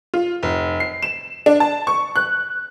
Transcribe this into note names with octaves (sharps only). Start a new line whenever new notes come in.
F4
F1
C7
E7
D4
A5
C#6
F#6